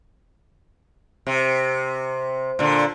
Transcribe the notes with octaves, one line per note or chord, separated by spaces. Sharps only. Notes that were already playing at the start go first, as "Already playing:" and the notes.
C3
A#2 D3